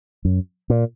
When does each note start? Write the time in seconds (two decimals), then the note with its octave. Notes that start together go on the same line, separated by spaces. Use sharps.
0.25 F#2
0.70 A#2